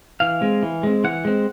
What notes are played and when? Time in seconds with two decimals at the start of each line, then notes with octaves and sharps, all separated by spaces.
0.20 E3 F5
0.41 G#3 C4
0.63 E3
0.83 G#3 C4
1.04 E3 F#5
1.25 G#3 C4